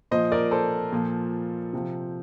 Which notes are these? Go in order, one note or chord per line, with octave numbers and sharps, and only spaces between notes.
A#2 F3 C5 D#5
A#4 D5
A4 C5
A#2 F3
C3 F3